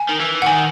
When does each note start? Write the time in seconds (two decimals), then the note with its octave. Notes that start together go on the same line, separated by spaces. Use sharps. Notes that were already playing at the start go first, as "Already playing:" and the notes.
Already playing: G#5
0.09 D#3
0.20 E3
0.42 F#5
0.46 D#3 G#5